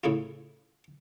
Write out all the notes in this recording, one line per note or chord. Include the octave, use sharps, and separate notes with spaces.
A2 C#3 E4 F4